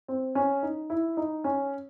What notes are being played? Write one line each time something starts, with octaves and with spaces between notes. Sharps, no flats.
C4
C#4
D#4
E4
D#4
C#4